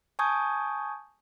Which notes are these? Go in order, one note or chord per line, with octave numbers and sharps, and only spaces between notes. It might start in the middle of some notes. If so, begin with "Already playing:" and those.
G#5 A5 C#6 D#6 G6 G#6